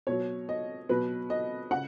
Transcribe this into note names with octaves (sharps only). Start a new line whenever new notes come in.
B2 F#3 C#5
D#5
B2 F#3 B4
D#5
C#3 F#5